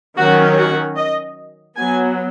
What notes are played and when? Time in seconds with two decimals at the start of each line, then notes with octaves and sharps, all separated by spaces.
0.17 D#3 F#3 C#4 F#4
0.57 F#4
0.96 D#5
1.76 F#3 B3 G#5